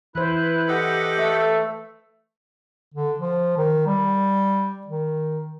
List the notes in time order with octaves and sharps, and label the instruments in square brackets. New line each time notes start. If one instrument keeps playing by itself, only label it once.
[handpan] E3 C5 [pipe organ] E4 B4 F#6
[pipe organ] G4 D#5 F#5 [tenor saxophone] A4
[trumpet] A3
[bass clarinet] D3
F3
D#3
G3
D#3